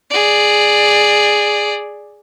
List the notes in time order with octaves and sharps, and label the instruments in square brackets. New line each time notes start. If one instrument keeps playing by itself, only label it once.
[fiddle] G#4 D5